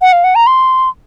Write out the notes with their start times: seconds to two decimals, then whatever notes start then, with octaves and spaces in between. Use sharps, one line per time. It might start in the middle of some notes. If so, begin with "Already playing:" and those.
0.01 F#5
0.12 F5
0.24 F#5
0.35 A#5
0.47 C6